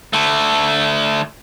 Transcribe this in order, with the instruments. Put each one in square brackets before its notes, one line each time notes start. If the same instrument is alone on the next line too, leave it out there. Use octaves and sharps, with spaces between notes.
[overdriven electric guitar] D3 A3